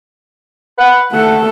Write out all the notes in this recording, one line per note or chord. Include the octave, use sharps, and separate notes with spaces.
B4 F#5
A3 A4 F#5